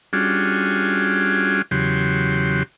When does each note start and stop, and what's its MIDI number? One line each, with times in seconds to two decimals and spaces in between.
0.13 1.62 55
0.13 1.62 61
0.13 1.62 62
0.13 1.62 65
0.13 1.62 66
0.13 1.62 68
1.71 2.63 40
1.71 2.63 49
1.71 2.63 54
1.71 2.63 67
1.71 2.63 84